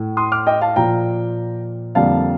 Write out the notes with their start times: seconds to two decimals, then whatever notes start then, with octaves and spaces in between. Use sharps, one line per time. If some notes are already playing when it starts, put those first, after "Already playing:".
Already playing: A2 A3
0.17 C6 D#6
0.32 D6 F6
0.47 D#5 G5
0.61 F5 A5
0.76 A#2 F3 A#3 G5 A#5
1.95 F2 D3 G3 A#3 F5 A5